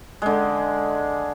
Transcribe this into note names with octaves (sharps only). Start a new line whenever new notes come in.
D3 G#3